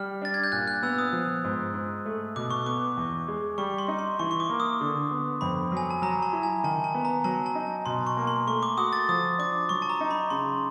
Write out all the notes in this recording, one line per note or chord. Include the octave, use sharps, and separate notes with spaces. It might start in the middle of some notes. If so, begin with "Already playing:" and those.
Already playing: G3 F6
D4 A6
G#6
G6
A#2 F#6
F#6
B3 E6
D#6
F3
G#2
G#2
A3
B2 D6
C#6
B3 D6
E2
G#3
G3 C#6
C6
D#4
C6
E3 C#6
C#6
D6
A#3
D#6
D3
B3
F2 B5
F#3 G#5
A5
F#3 A#5
A5
E4
G#5
D#3 A5
A5
B3
A#5
F#3 A5
A5
D#4
B2 C6
C#6
A#3
C6
A3 C#6
D6
F#4 D#6
A6
F3 D#6
D4 D6
F#3 C#6
A5
A#5
D#4
B5
C#3 C6